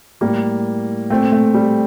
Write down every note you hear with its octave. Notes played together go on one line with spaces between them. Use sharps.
A2 G3 A#3
A#2 A3 C4
A3
G3